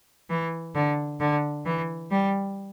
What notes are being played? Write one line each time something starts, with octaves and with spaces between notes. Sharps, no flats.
E3
D3
D3
E3
G3